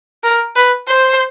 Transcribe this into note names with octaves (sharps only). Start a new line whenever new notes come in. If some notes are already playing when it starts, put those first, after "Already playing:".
A#4
B4
C5